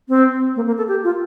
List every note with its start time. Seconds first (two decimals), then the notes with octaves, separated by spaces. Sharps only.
0.09 C4
0.56 A#3
0.67 A#3
0.78 A4
0.88 G4
1.04 F4